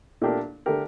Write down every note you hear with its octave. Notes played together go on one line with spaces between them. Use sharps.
A#2 A3 D4 G4 A#4
D3 A3 D4 G4 A#4